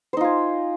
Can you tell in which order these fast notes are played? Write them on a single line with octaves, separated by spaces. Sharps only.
C5 D#4 F4 G#5